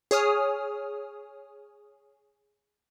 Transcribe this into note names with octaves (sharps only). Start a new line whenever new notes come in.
G#4 C#5 D#6 F6